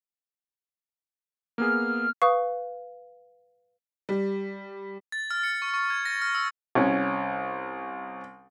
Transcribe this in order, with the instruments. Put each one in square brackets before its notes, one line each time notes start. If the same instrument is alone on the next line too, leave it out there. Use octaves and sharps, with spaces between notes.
[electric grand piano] A#3 B3 G#4 [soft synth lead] F6
[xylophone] B4 F5 [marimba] C#6 D#6
[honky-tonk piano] G3
[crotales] A6
F6
C#7
C#6
C#6
G#6
A#6
F6
E6
[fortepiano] C2 C#4